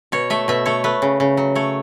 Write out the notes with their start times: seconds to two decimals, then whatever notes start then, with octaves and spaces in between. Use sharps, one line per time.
0.12 B2 C#5
0.30 A3 E5
0.48 B2 E5
0.66 A3 C#5
0.84 A3 B4
1.02 C#3
1.20 C#3
1.37 F#3
1.55 A3 C#5